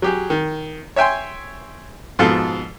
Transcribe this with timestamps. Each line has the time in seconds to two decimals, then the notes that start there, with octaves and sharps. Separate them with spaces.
0.02 F#3 G4 G#4
0.30 D#3
0.96 C#5 E5 G5 G#5 C6
2.19 G#2 B2 F3 A4